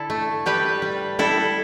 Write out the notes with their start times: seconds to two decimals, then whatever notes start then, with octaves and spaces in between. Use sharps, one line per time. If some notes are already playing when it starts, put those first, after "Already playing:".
Already playing: D3 E4 A4
0.10 A3
0.46 G3 G4 B4
0.82 G3
1.19 G3 E4 A4